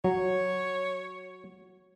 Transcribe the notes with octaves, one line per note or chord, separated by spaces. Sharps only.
F#3 C#5